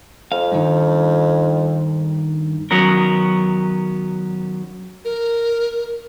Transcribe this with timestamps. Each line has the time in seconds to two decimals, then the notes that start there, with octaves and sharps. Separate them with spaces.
0.32 F2 F5
0.52 G2 D#3
2.71 D#3 F#3 B3 C#4 A#4
5.05 A#4